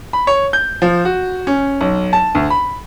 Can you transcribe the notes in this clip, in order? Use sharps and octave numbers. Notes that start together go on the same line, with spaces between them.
B5
C#5
G6
F3
F#4
C#4
B1
A5
D2
B5